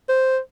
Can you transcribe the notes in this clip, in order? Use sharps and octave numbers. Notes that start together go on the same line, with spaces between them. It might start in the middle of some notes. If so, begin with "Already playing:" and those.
C5